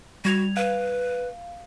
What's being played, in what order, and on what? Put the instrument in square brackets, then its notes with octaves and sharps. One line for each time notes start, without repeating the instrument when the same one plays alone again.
[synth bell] G3 G#6 F7 [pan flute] F#4
[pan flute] B4 [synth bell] F5